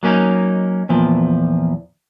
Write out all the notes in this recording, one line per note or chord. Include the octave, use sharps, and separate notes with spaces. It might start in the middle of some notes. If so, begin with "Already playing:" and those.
F#3 A#3 C#4 D#4
E2 A#2 F3